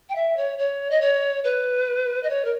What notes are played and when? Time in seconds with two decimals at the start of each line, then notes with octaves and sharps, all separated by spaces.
0.09 G5
0.15 E5
0.36 C#5
0.58 C#5
0.90 D#5
1.01 C#5
1.44 B4
2.23 D#5
2.29 C#5
2.44 A#4